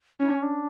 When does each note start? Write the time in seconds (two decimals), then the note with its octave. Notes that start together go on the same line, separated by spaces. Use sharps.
0.20 C#4 E4
0.28 D4
0.35 C#4
0.42 D4